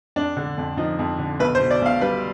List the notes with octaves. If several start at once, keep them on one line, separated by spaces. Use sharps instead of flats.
F2 D4
D3
F2
F3 D#4
F2
D3
B1 B4
C5
B2
D5
B1 F5
G3 B4